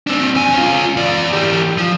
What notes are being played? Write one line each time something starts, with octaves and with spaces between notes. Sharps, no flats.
C4 D4
F2 G#5
C#4 F4
E2 D5
E3 G4
F3